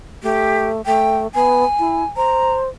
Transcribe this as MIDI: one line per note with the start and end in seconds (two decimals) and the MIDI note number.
0.23 0.81 57
0.23 0.67 67
0.86 1.27 57
0.86 1.17 79
1.34 1.64 59
1.34 2.06 80
1.79 2.03 64
2.17 2.69 72
2.17 2.53 82